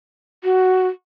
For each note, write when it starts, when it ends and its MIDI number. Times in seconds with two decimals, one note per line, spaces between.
0.44 0.88 66